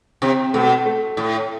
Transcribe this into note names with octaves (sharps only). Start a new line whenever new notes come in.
C3 C4
B2 A3
A3
A2